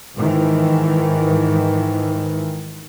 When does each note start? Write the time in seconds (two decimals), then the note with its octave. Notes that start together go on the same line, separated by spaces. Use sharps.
0.16 G#2 D#3 E3